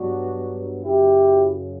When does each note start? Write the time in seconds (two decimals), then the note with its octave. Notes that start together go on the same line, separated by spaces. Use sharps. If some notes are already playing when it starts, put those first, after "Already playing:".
Already playing: G2 F#3 B3 D4 F#4
0.83 F#2 C#3 F#3 E4 G4